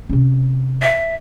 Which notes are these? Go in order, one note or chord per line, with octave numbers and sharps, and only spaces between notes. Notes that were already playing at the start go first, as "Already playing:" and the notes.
C3 C#4
E5